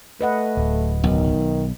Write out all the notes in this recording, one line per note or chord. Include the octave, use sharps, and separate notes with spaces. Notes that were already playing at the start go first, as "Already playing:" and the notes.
A3 B4 D#5 F#5
D1
B1 D#3